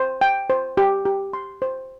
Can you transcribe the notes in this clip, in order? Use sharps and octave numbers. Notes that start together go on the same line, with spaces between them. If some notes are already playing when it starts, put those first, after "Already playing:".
Already playing: C5
G5
C5
G4
G4
C6
C5